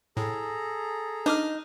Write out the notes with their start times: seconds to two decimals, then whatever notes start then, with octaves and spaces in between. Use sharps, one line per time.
0.17 A2 G#4 A4 A#5
1.26 D4 D#4 D6 F6